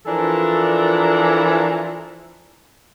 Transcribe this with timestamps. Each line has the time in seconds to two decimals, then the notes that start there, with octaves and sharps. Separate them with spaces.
0.06 E3 F3 D4 A4 A#4